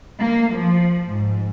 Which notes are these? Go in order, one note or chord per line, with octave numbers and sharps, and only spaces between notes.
A#3
F3
G#2